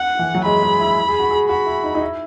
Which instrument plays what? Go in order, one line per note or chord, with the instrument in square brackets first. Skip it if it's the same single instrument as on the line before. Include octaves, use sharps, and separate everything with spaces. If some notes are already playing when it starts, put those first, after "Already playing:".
Already playing: [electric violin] F#5
[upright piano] E3
F#3
[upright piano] G#3 [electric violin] B5
[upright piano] G#3
E4
G#4
F#4
G#4
[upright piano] F#4 [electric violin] B5
[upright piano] E4
D#4
D#4
E4